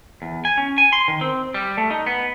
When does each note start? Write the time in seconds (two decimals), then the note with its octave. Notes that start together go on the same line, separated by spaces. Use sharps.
0.22 E2
0.45 G#5
0.58 C#4
0.78 G#5
0.93 C6
1.08 D#3
1.21 C4
1.54 G3
1.77 A3
1.90 D#4
2.06 B3